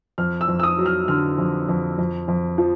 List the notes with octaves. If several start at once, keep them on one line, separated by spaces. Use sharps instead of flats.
F2 F6
E6
F2
E6
D#6
F#3
F6
D3 F6
F2
F2
F2
F2
F3